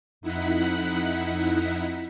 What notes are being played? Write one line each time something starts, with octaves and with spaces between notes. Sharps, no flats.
F2 D#4 E4 F#5 F#6 B6